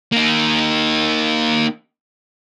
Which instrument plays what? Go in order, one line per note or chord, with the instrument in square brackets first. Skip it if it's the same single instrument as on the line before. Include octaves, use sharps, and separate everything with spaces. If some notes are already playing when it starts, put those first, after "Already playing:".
[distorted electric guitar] A#3 D#4